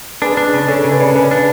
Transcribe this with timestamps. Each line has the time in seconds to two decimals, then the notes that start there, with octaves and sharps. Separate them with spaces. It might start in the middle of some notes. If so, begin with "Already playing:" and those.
0.22 D4 G#4 B4
0.37 D4
0.53 C#3
0.68 D4 A4 C#5
0.84 C#3
0.92 B4 D5
1.00 C#3
1.15 C#3 B4 D5
1.31 D4